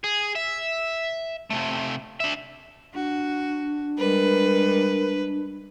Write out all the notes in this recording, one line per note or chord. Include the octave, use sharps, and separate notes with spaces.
G#4
E5
C3 A3
D4 E5
D4 F#4
G3 G#3 A#4 B4